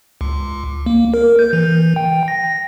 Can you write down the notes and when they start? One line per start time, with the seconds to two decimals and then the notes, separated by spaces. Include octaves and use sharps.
0.21 C#2
0.86 A#3
1.14 A#4
1.39 G6
1.53 E3
1.96 G5
2.28 A#6